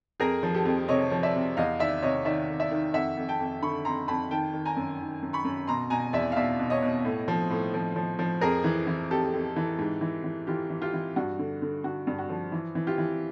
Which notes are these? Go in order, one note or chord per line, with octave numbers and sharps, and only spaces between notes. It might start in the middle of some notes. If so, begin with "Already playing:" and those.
F2 G#4 A#4
F3
G4 A4
F2
C3 C#5 D#5
F3
D5 E5
C3
E2 D#5 F5
D#3 D5 E5
C3 C#5 D#5
D#3 D5 E5
D#3
D5 E5
D#3
F2 E5 F#5
F2
G5 A5
F2
D3 B5 C#6
F2 A#5 C6
F2 A5 B5
D#3 G5 A5
D#3
G#5 A#5
F#2
D#3
F#2
B5 C#6
F#2
B2 A#5 C6
B2 G#5 A#5
E2 D5 E5
F5
B2 D5 E5
B2
C#5 D#5
B2
A2
F3
A2
F3
F3
F3
F2 G#4 A#4
E3
E3
F2 G4 A4
F2
E3
G#2
E3
E3
E3 F4 G4
E3
F4 G4
E3
G2 F#4
D3
D3
D3 F#4
G2
F#4
F3
E3
E3
F4 G4
E3